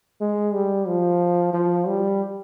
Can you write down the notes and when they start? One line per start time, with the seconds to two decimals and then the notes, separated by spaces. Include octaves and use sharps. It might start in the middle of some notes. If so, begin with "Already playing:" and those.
0.21 G#3
0.54 G3
0.87 F3
1.53 F3
1.87 G3